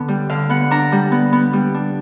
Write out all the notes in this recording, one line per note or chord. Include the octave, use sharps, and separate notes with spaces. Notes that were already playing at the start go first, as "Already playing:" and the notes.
Already playing: D3 B3
G3
D3 F5
B3 F#5
D4 A#5
G3
B3
B3
G3
D4